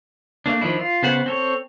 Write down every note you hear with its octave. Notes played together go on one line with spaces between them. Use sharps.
A3 A#3 D4
D#3 F3 D4 E4
F4
C#3 B3 C5 F#5
C4 A4 C#5